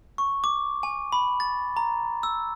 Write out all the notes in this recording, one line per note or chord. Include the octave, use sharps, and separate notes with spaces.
C#6
D6
G#5
B5
A6
A#5
E6